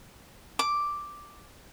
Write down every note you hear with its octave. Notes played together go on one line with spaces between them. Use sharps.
D6